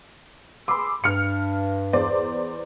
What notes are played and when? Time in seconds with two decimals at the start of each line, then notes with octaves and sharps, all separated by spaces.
0.68 G#4 B5 C6 D6 E6
1.04 G2 F6 C#7
1.93 E2 C5 D5